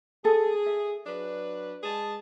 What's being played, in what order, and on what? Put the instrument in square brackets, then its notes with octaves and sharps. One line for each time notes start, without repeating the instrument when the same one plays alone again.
[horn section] G#4 [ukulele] A4
[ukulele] E5
[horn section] F#3 D4 B4
G#3 G#4 A5